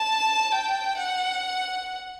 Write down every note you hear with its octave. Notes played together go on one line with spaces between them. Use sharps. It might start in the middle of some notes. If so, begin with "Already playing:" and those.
Already playing: A5
G5
F#5